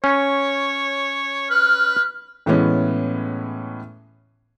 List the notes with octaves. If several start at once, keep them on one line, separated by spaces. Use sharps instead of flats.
C#4 C#5
B4 F6
A2 E3 G#3 B3 C#4